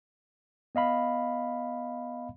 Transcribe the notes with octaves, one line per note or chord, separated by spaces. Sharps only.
B3 D#5 F5 B5